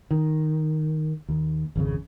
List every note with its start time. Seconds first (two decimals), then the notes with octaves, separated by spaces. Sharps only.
0.11 D#3
1.28 D#2
1.75 G#1 F2 C#3